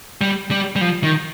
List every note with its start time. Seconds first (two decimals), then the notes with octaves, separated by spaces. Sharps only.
0.21 G3
0.51 G3
0.76 G3
0.81 F3
1.04 D#3